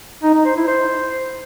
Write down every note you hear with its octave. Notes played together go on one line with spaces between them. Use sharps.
D#4
D#4
C5
E4
C5